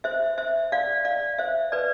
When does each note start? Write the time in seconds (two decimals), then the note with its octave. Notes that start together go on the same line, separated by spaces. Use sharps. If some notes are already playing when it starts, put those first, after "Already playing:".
0.04 C5 E5
0.38 C5 E5
0.72 D5 F5
1.05 D5 F5
1.38 C5 E5
1.72 B4 D5